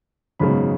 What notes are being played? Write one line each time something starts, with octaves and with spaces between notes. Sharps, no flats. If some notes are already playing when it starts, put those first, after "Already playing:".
G#1 F#2 C#3 G#3 B3 B5